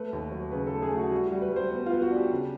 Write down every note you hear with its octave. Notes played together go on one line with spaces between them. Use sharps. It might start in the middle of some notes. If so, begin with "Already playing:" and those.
Already playing: A3 B4
D#2
F#3
C#3 B4
A4
A3
G#4
A3
F#4
G3 F#4
G3 F#4
B4
G3 C5
B3
F4
B3
F#4
D4
G4
C#3